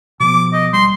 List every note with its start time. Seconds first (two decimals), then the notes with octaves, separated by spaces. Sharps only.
0.20 B2 F3 B3 D6
0.53 D#5
0.73 D#1 G3 C6